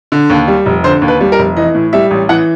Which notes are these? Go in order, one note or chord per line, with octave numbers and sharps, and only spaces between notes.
D3
D#2
G3
F1
D3 C5
D#2
B4
G3
A#4
F1
E3 D#5
A2
G3 E5
A1
E3 F#5